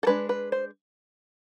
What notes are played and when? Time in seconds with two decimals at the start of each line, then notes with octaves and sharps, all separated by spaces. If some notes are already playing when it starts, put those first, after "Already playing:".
0.03 A4
0.07 G#3 D4 B4
0.29 B4
0.52 C5